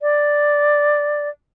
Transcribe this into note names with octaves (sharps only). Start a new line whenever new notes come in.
D5